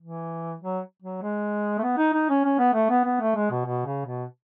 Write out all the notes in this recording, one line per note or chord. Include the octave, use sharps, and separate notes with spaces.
E3
F#3
F#3
G#3
A3
B3
D#4
D#4
C#4
C#4
B3
A3
B3
B3
A3
G#3
B2
B2
C#3
B2